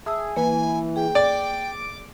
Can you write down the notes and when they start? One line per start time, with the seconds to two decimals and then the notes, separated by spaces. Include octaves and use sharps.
0.06 G#4 E5 A5 E6
0.36 E3 A#3 B4 G#5
0.96 G#4 G5
1.15 D5 D6